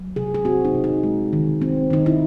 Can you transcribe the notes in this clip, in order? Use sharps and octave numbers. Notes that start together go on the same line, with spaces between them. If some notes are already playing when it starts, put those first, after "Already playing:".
Already playing: F#3
C3 G#4
G#4
C4 F#4
D#4
C3
D#4
G#3
D#3
C4
D#3 D#4
E4